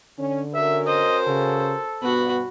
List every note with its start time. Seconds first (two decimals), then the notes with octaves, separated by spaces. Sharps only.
0.19 D3 C#4
0.55 C#4 F#4 A#4 E5
0.87 C5 D#5
1.27 C#3 A4
2.02 G2 B2 B3 F#4 B5